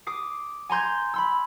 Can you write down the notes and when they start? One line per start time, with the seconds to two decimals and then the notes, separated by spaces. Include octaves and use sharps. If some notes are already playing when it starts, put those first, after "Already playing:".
0.07 D6 D#6 C7
0.70 G#5 A#5 C6 G6 G#6
1.14 B5 C6 E6